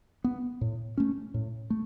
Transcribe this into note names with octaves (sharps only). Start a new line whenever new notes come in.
B3
A2
A3 C#4
A2
A3